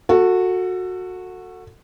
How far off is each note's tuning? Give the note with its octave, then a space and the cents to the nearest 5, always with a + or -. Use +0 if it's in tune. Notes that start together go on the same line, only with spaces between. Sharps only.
F#4 -15 A4 +20